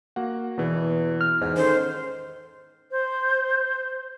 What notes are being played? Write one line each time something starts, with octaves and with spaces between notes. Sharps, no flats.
A#3 F#4 F#5
E2 B2 E3
F6
E2 G#2
D#3 C#4 A4 C5
C5